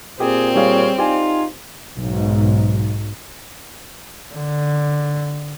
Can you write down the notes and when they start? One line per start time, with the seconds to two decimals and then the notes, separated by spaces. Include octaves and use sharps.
0.20 A#2 C4 G4 G#4
0.55 G3 G#4 C#5 F5
0.98 D#4 F4 G4 D5 G#5
1.99 B1 G#2
4.35 D3